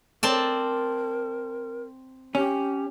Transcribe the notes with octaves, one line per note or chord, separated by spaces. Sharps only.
C4 A#4 D5 A5
C#4 G4